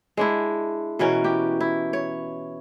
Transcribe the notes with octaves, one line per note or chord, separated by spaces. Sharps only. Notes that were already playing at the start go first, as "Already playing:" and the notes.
G#3 D4 E4
B2 E3 C#4 A#4
G4
E4
C#5